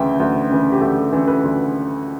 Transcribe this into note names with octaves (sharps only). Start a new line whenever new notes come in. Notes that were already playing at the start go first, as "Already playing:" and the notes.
Already playing: D2 C#3 E3 E5 G5
D2
C#3 E3
G4
D2 A4
G4
C#3 E3 A4
B4
D2